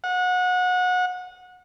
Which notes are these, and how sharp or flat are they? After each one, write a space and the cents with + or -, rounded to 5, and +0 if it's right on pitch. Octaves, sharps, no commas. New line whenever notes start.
F#5 -25